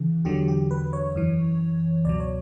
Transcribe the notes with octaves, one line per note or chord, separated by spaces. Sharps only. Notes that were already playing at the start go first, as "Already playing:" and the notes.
Already playing: C#3 E3
E2 D3 F#3 G4
G4
B4
C#5
F#2 E3
C#2 B2 F#3 D5
C#5